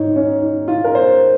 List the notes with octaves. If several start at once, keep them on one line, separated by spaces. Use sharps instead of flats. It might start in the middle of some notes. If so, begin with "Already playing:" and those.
Already playing: G#2 D#4 C#5 D#5
C#4
D#4
F4
A#4
C5